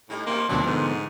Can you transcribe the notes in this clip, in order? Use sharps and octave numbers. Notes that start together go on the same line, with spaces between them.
A2 G3 D#4
G2 B2 G3 A#3 C6
D2 B2 E3 F#3 C4 D4 A#4
G#2 D3 B3